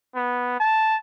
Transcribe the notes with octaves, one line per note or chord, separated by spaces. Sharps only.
B3
A5